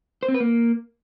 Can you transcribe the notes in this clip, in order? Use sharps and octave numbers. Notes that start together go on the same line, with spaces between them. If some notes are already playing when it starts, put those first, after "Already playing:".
C5
C4
B4
A#3